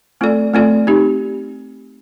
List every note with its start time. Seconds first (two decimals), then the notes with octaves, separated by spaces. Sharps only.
0.21 A3 C4 F4 A4 D5
0.54 A3 C4 F4 A4 D5
0.87 C4 D#4 G4